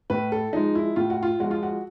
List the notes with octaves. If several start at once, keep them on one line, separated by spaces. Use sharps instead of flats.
A2 B4
A4
F3 G#3 D#4
E4
A2 F4
F#4
F4
F3 G#3 F#4
F4
F#4